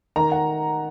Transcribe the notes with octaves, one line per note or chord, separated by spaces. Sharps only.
D#3 A#5
F#5